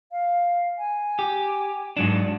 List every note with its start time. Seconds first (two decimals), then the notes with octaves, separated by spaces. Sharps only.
0.12 F5
0.78 G#5
1.19 G4
1.97 G#2 F#3 D4